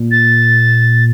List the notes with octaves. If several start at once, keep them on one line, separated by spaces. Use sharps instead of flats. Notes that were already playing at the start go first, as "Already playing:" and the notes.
Already playing: A#2
A6